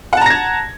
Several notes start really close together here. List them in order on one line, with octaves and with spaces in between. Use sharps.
F#5 A5 A#5 A#6 G#6